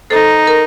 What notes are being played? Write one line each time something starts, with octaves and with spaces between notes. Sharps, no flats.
D#4 A4 C5
A#4